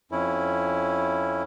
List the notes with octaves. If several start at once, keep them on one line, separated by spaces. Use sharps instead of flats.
F2 C#4 E4